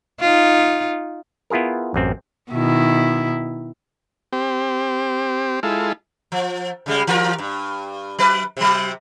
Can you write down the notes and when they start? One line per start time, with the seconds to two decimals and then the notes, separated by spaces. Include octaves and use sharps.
0.20 D#4 F4
1.50 B3 E4 F4 G#4 A#4
1.94 A1 F#2 C4
2.51 B2 D#3 E4
4.33 C4 G4
5.63 G#3 E4 F4 A4
6.32 F3
6.86 C#3 G3 G#3
7.07 E3 F4 A#4
7.38 G2
8.19 F#3 B4
8.57 C3 F#3